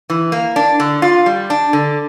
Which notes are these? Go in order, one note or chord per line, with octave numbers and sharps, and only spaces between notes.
E3
A#3
D4
D3
F4
G3
D4
D3